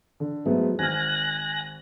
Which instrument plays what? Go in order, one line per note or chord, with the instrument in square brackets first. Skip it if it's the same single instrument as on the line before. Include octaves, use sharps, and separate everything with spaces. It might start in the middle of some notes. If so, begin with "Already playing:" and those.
[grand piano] D3
[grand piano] G#2 A3 B3 [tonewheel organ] F#3
[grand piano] G#1 F6 [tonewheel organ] G#5 F#6 A#6